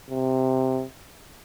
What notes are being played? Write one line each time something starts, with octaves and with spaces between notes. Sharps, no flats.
C3